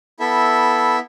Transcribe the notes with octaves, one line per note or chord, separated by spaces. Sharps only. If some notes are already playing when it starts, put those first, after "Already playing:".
B3 E4 A4 E5